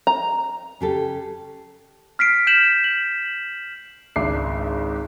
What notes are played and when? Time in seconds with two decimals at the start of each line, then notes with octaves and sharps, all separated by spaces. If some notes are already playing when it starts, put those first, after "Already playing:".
0.07 A#5
0.81 C#3 G4 A4
2.19 F6 B6 C7 D7
2.47 F6 G6 B6 E7 F#7
2.84 F#7
4.16 G#1 C#2 D4 E5 D6 C7